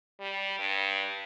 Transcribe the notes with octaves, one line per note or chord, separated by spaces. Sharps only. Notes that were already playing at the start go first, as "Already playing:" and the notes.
G3
G2